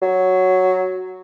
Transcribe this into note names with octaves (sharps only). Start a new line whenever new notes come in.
F#3